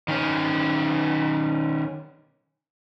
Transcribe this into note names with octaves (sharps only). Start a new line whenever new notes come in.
D#3 C#4